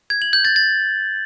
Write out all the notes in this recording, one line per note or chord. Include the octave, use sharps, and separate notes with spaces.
G#6
F#7
G6
A6
A6